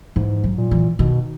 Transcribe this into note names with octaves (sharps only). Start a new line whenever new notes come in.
G#2 E3
F#3
A#2
E3
B2 D#3